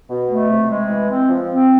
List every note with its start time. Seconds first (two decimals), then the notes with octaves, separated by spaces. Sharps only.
0.09 B2
0.29 A3
0.50 C3
0.70 G#3
0.89 E3
1.10 C4
1.29 F3
1.50 C4